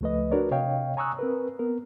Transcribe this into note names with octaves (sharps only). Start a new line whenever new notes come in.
C#2 F3 A3 B4 D#5
D4 F#4 A#4 B4 C#5 D5
C3 C#5 D#5 F5 G5
G#5 A#5 C#6 D#6 E6 F#6
C4 A#4 B4
B3 A#4